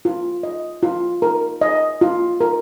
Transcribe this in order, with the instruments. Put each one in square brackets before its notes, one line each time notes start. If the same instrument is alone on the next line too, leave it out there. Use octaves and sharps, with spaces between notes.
[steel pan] F4
D#5
F4
A#4
D#5
F4
A#4